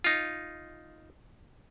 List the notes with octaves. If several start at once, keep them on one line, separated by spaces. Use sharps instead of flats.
D#4 F4